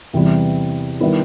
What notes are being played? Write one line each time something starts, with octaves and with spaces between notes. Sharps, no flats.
E2 C3 E3 G3
D#3 G3 B3 E4